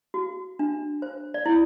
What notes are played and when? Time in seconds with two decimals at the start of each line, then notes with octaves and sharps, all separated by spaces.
0.14 F#4
0.59 D4
1.02 C5
1.34 D5
1.46 E4